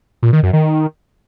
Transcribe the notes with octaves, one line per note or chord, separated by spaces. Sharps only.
A#2
D#3
F#2
D#3